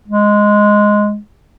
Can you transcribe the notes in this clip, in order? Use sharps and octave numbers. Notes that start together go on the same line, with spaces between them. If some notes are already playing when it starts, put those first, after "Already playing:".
G#3